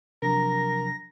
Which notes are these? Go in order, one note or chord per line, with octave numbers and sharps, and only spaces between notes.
C3 F3 F#3 D4 A#4 A#5 A#6